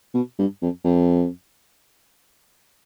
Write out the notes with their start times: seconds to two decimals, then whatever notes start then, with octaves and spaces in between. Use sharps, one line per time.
0.14 B2
0.38 G2
0.62 F2
0.84 F2